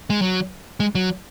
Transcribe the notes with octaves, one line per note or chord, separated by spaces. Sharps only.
G#3
F#3
G#3
F#3